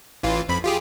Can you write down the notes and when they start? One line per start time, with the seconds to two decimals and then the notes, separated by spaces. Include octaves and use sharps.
0.23 A1 E3 F4
0.49 F2 B5
0.64 F4 G4 G#4